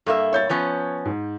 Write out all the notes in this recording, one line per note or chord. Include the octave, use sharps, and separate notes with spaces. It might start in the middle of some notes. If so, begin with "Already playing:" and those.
G2 A#3 A4 E5
C#5 G6 A6
F3 B3 C#4
G#2